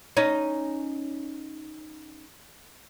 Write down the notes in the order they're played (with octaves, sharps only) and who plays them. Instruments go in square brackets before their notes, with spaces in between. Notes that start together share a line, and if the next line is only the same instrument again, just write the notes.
[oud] C#4 D#4